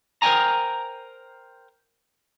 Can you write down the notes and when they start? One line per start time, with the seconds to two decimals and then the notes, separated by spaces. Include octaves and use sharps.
0.22 A#4 C5 D5 G5 G#5 A#5